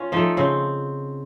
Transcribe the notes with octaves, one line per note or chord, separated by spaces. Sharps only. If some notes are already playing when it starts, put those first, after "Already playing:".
Already playing: C#4 F4
F3 A3 D#4
C#3 C4